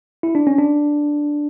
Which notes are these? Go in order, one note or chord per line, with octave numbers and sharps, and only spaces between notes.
E4
D4
C#4
D4